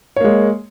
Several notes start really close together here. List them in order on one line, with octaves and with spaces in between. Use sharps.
C#5 A#3 G#3